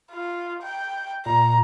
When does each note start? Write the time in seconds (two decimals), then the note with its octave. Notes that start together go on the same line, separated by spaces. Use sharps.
0.12 F4
0.62 G5
1.26 A#2 A#5